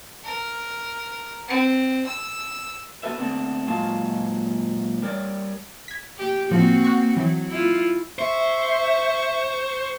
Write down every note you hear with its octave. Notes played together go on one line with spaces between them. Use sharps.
A#4
C4
E6
B3 F#4 A4 B4 E5
D3 A3 B3 C4 D4
A#2 F#3 G#3 F4 F5 A5
G3 A#4 C#5 D5
G#6 B6
G4
A2 F3 A#3 C4 F#4
F#5 C#6
E3 F#3
E4 F4
C5 E5 C#6